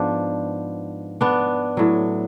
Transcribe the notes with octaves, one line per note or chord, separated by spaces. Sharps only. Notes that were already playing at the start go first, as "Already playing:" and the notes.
Already playing: G#2 F3 B3 D4
B3 D4
A2 F#3